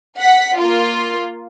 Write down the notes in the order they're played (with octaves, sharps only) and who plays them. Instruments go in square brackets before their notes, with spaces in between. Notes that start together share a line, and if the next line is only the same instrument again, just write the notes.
[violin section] F#5 B6
A#3 F4